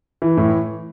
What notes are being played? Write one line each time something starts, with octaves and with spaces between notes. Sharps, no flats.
E3
A2